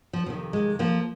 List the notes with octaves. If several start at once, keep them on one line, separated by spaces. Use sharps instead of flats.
F3
F2 C3 D#3 F3
G#3
F3 A#3